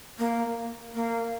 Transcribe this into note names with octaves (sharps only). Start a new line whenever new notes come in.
A#3
A#3